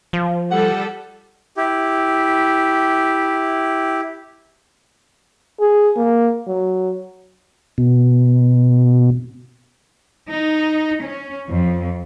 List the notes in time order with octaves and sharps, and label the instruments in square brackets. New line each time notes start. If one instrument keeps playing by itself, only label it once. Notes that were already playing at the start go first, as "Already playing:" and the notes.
[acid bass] F3
[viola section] G3 A4 [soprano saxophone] F#5
[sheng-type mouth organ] E4 G4
[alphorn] G#4
A#3
F#3
[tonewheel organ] B2
[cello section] D#4
C#4
F2